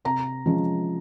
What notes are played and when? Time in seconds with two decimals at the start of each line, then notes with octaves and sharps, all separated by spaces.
0.05 C3 A#5
0.46 F3 G#3 C#4